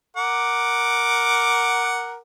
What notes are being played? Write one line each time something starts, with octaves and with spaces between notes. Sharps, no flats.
A#4 F#5 D6